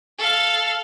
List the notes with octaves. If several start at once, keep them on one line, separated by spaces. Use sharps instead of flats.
A4 F5